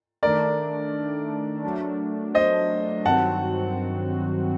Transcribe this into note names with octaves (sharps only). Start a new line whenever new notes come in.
D#3 A3 D4 A#4 D5
F#3 A3 D4
C5 D#5
G2 D#3 F#3 C4 F#4 F#5 A5